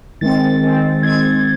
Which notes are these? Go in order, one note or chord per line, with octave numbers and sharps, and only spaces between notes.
D#3 G#3 C4 A6
D#3 G#3 C4
D#3 G#3 C4 G#6